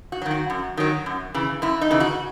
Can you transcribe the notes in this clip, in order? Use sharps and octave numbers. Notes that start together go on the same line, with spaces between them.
F#4
D#3 F#3
F#4
F#2
D#3 F#3
F#2
C#3 E3
F#2 E4
D#4
C#3 E3
F#4